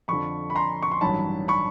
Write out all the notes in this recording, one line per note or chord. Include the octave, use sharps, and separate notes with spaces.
F2 D3 F3 B5 C#6
B5
A#5 C6
C#6
C6
A1 G2 D#3 F#3 A5 B5
B5 C#6